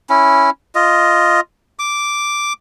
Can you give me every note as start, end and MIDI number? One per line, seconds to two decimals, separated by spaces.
0.10 0.50 61
0.10 0.50 64
0.75 1.40 65
0.75 1.40 75
1.79 2.53 86